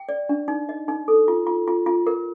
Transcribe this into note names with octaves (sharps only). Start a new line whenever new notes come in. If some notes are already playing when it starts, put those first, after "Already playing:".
Already playing: G5
D5
D4
D#4
D#5
D#4
A4
F4
F4
F4
F4
A#4